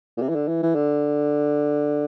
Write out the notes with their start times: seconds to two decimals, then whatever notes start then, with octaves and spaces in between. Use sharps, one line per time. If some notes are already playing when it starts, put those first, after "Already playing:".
0.17 A#2
0.21 C3
0.29 E3
0.35 D3
0.48 E3
0.63 E3
0.75 D3